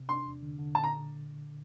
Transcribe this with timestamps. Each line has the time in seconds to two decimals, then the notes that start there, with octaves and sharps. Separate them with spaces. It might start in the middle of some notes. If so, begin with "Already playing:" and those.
Already playing: C3
0.09 D4 C6
0.26 E2
0.43 D3
0.58 D3
0.75 A#2 A5
0.84 A#5